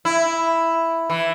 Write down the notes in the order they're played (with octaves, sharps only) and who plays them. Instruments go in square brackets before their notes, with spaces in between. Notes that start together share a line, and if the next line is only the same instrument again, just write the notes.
[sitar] E4
E3